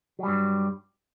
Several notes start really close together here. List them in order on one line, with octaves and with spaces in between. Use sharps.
F#3 G3 G2